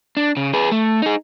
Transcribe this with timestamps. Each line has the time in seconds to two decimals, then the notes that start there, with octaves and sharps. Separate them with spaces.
0.17 D4
0.37 C#3
0.53 G#4 B4
0.72 A3
1.02 D#4 G#4